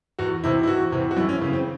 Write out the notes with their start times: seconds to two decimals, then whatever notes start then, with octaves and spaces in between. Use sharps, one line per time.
0.19 E2 F#4
0.44 C3 E3 E4
0.63 E4
0.67 E2 F#4
0.92 C3 E3
1.11 F#4
1.17 F#2 E4
1.29 C#4
1.41 C#3 E3
1.53 C4